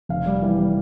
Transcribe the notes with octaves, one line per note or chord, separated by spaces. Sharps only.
F1 F5
G3
E3
G3